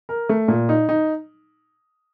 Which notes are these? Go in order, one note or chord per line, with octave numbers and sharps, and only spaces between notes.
A#4
A3
A#2
D#4
D#4